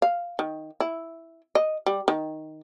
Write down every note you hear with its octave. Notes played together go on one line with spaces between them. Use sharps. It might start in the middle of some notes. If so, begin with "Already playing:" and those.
F5
D#3
E4
D#5
G3
D#3